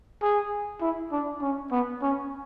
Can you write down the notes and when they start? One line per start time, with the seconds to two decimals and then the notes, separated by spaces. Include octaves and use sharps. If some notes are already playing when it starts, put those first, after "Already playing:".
0.22 G#4
0.81 E4
1.12 D4
1.42 C#4
1.72 B3
2.02 C#4